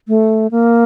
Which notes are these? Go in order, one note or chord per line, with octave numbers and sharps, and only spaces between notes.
A3
A#3